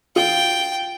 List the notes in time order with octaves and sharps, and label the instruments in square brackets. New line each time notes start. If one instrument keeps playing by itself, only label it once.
[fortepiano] F4 [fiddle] G5